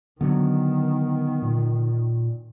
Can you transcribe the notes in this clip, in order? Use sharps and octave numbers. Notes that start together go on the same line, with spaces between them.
D3 D#3 F#3 B3
A#2